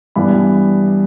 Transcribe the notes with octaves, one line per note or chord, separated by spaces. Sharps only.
G2 E3 B3 D4 B5